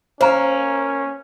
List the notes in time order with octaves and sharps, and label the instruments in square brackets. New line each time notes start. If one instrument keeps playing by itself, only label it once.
[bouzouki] A#3 [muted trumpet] C#4 [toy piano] C5 A#5